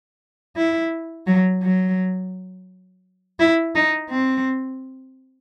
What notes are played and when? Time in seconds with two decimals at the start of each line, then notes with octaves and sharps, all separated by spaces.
0.57 E4
1.27 F#3
1.63 F#3
3.40 E4
3.75 D#4
4.10 C4